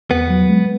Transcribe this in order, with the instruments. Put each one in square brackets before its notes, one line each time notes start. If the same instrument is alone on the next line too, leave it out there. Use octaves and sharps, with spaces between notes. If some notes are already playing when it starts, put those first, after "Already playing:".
[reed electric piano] E2 [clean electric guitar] B3
[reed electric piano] F#3
G#3